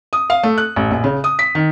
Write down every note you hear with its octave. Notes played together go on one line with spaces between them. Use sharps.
D#6
F5
A3
F#6
A1
A#1
C#3
D#6
B6
D#3